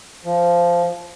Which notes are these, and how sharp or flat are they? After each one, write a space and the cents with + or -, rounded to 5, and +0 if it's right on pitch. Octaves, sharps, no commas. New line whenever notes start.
F3 -10